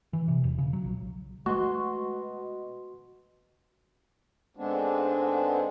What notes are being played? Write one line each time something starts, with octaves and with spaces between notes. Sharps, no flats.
E3
C3
E1
C#3
F#3
A#1
B2 G#3 A3 F#4 C6 C#6
G#2 D3 G#3 B3 C4 D4